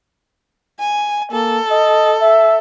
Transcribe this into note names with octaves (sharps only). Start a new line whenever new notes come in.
G#5
A#3 A4
D#5
E5